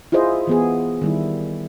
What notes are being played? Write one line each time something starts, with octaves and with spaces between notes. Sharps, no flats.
E4 F4 G#4 C5 D#5
E3 B3 G#4
D#3 G3 E4